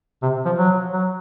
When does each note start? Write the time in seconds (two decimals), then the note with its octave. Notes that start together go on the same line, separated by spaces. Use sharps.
0.22 C3
0.46 F3
0.58 F#3
0.93 F#3